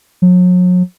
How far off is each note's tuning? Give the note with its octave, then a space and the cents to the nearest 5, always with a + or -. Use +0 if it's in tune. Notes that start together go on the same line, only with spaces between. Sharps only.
F#3 -40